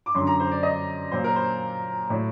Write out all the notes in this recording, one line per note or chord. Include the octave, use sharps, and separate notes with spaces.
D6
F#2 D3 F#3 C6
A#5
C5
D5
D#5
A#2 F#3 C5
A#4
C5
A2 F#3